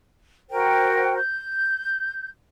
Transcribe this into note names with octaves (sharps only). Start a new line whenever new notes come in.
F#4 A#4 C5 G5
G6